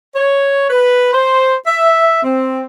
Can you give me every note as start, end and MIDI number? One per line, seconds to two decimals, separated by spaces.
0.15 0.68 73
0.70 1.11 71
1.13 1.55 72
1.67 2.21 76
2.24 2.63 60